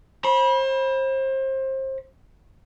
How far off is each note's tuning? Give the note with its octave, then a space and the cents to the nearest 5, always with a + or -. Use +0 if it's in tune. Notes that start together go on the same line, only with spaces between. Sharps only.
C5 +30 B5 -25